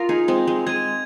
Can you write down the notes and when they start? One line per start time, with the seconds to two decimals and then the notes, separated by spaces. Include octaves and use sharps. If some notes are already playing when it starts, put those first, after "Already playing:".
Already playing: F4 A#4 D#6 A#6 F7
0.09 D#4 G#4
0.28 G#3 C4
0.47 G#3
0.67 G#3 G#6 D#7